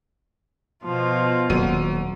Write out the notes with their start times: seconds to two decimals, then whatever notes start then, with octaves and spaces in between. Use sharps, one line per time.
0.84 B2 F3 F4
1.50 D#1 F#3 D#7